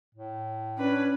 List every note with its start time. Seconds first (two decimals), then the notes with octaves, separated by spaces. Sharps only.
0.15 A2
0.78 C#4 D4 B4